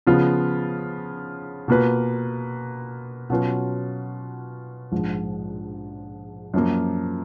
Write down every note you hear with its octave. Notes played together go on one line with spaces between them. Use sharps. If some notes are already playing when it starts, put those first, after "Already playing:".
C#3 F3 B3 F4
B2 A#3 F4 B4
B2 F#3 C#4 F4 B4
A#1 G#2 F3
F#2 F3 A#3